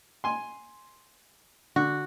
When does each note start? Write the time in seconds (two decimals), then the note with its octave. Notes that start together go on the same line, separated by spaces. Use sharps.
0.24 G#5 C6
1.76 D3 F#4